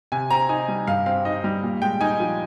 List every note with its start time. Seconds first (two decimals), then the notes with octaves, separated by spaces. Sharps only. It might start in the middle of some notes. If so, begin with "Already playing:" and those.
0.12 C3 G#5
0.30 C4 A#5
0.49 D#4 G#5
0.68 G3
0.87 G2 F5
1.06 C4 F5
1.25 D#4 D#5
1.44 G3
1.63 A#2
1.82 G#3 G5
2.01 D#4 G#5
2.20 F3